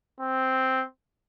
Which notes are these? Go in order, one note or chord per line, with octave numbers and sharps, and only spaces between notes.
C4